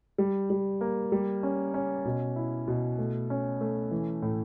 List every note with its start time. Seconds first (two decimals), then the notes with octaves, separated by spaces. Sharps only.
0.18 G3
0.50 G3
0.81 A#3
1.12 G3
1.43 C#4
1.74 C#4
2.05 B2
2.36 E4
2.68 B2
2.98 A3
3.30 C#4
3.61 A3
3.91 E3
4.22 A2